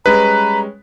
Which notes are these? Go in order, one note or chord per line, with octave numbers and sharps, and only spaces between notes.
G3 G#3 C#4 B4 A#5